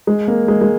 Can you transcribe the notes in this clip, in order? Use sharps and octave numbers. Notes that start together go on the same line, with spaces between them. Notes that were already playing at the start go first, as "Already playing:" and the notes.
G#3
A#3
G#3
G#3